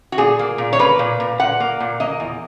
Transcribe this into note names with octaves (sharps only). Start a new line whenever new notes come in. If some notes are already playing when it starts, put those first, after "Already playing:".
F#4
A#2 G#4
A#3
A#2
C#5
A#3 B4
A#2
A#2
A#2 F#5
A#3
A#2
A#3 D#5
E2